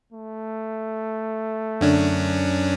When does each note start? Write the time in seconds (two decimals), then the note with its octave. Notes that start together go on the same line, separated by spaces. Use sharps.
0.12 A3
1.81 F#2 D3 C#4 D4